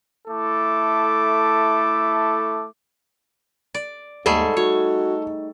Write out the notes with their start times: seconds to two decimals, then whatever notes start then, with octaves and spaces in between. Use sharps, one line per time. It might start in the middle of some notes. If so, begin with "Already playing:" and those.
0.28 A3 E4 A4 D6
3.74 D5
4.26 D#2 G#2 G3 A3 G#4 A4
4.57 D#4 F#4 C#5